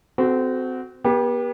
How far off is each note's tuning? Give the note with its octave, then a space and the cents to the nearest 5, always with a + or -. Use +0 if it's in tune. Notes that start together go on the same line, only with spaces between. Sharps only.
C4 -25 F#4 +0 A4 -25
B3 -40 G4 +15